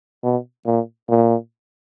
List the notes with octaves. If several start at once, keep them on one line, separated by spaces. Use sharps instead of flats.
B2
A#2
A#2